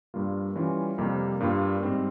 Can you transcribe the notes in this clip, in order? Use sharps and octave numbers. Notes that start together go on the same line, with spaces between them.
G2 G3 A#3 F4
E3 G3 C#4 F4
F2 C3 G3 A#3
G2 G3 A#3 F4
G#2 G3 C4